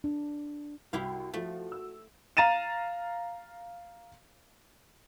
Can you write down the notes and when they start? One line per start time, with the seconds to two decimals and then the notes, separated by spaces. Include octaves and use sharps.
0.04 D4
0.93 C2 E4 F#4 G4 F5
1.34 F3 A3 F#4
1.72 E6
2.37 F5 A#5 A6 D#7 E7